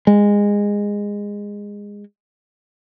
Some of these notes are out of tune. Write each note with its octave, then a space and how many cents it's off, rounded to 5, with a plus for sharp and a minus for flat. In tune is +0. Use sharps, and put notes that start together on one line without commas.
G#3 -20